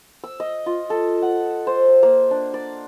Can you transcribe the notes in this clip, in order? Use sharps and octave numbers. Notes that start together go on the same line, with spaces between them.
E6
D#5
F4
A4
F#5
C5
A#3
D4
D5